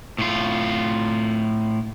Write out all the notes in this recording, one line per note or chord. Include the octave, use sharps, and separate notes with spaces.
A2 F4